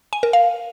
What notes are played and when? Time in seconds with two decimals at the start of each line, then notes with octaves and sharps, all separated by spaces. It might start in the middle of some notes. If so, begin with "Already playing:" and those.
0.13 G#5
0.23 A#4
0.33 F5